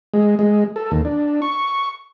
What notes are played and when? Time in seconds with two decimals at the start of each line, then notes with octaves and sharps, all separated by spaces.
0.14 G#3
0.39 G#3
0.76 A4
0.91 D#2
1.05 D4
1.42 C#6